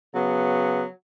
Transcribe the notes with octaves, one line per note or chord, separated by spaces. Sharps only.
C#3 F#3 B3